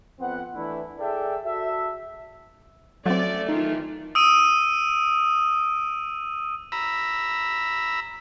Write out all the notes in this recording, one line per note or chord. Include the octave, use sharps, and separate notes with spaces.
F2 B3 C4 F#5
E3 A3 D4 E4
G#4 A4 D5 E5 G5
F#4 A4 E5
F#3 A3 C4 C#4 D5
D#3 E3 D#4 F4
D#6 E6 D7 D#7
A#5 B5 E6